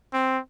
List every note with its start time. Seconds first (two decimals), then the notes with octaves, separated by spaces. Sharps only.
0.13 C4